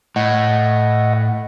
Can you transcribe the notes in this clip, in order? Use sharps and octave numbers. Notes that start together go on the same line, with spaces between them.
A2 D#5 F#5